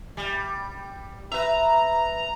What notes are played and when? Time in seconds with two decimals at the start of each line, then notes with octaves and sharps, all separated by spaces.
0.17 G3
1.32 B4 E5 A#5